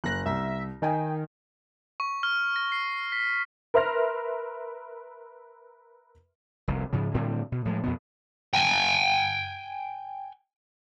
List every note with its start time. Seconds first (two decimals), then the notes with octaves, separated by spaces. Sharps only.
0.04 F#1 F#6 A#6
0.26 C2 E5
0.82 D#3 D#5 G5 G#5
2.00 C#6
2.23 F6
2.56 A#6
2.72 C7
3.12 B6
3.74 A#4 B4 E5 C6 F6 A#6
6.68 F1 C2
6.93 G#2 C#3 F3
7.14 A2 D3 G3 C4
7.52 B2
7.65 A2 F3 F#3 G#3
7.84 F2 B2 B3
8.53 G5 G#5